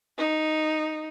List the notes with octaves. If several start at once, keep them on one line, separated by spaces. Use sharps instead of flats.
D#4